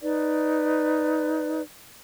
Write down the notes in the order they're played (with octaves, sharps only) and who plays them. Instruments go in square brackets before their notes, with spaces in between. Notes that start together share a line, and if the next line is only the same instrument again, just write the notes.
[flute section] D#4 B4 D5